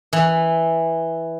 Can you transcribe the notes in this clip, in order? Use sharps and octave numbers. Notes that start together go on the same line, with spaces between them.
E3